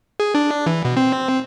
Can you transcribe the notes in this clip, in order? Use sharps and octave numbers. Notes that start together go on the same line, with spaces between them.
G#4
D4
E3
B2
C4